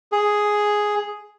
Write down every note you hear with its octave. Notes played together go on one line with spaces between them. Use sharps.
G#4